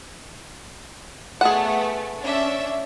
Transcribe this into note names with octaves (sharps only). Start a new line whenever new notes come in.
A3 B3 G#4 F#5
C#4 D4 E5